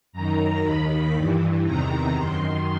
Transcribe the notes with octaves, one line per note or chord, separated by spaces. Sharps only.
F#2 D#3 A#5
D#2 D#3 B5
G2 E3
E2 C3 D#3 A#5
F#2 D#3 C6